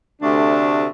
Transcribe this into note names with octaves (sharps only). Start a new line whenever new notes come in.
D2 C3 A3 D4